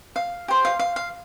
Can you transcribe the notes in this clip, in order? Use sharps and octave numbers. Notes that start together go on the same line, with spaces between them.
F5
G4 C5
F5
F5
F5